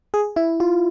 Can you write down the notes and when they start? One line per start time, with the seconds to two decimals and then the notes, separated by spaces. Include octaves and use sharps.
0.14 G#4
0.36 E4
0.60 F4